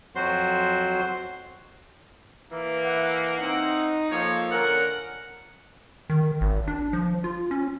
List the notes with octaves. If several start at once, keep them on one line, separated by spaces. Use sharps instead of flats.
F2 F#3 F#4 C5 C6
E3 A#3
E5 F#5
C4 D#4 E5 F#5
F3 A#3 A4 C#5
D3 C#4 A4 A#4 F#5
D#3
G#1
D4
F3
F4
C#4